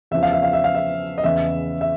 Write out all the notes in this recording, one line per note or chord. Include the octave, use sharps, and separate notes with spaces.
E2 C#3 F3 E5
F5
E5
F5
E5
F5
E5
D#5
E2 C#3 E3 E5
E5